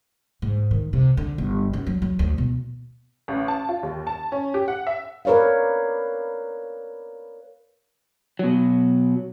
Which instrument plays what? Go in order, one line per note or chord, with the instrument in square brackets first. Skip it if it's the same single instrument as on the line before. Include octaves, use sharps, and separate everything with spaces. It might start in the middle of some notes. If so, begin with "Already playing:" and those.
[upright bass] G#2
D#3
C3
D3
G1
F#2
F#3
F#3
D2
B2
[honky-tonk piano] A1
A5
F4
D#2
A5
C#4
G4
F#5
E5
[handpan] A#4 B4 C#5 D5 F5
[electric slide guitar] B2 F#3